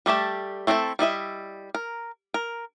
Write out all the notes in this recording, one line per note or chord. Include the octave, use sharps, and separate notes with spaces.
G3 A3 G4 A5
A3 C4 E4 F#4 A4
G3 E4 D#5 E5
A#4
A#4